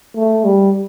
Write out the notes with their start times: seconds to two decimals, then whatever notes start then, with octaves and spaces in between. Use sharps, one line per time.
0.16 A3
0.45 G3